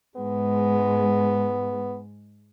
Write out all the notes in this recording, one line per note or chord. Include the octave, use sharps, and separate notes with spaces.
G#2 G#3 B3